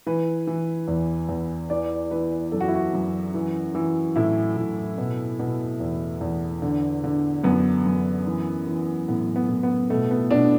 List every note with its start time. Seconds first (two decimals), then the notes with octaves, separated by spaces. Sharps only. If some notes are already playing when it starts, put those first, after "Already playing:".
0.07 E3 B4
0.47 E3
0.88 E2
1.29 E2
1.70 E3 D5
2.11 E3 B4
2.52 F#2 A4
2.60 F#4
2.68 E4
2.75 F#4
2.94 F#2
3.34 E3
3.75 E3
4.16 A2 E4
4.57 A2
4.98 B2
5.40 B2
5.80 E2
6.21 E2
6.62 D3
7.04 D3
7.44 F#2 B3
7.86 F#2
8.26 E3
8.67 E3
9.08 A2 B3
9.36 B3
9.49 A2
9.63 B3
9.90 B2 A3
10.11 B3
10.31 B2 D4